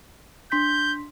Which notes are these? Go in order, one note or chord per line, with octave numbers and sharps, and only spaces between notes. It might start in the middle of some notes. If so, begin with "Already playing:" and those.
D4 C6 G6 B6